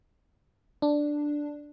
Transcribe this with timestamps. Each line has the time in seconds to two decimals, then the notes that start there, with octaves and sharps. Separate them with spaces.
0.82 D4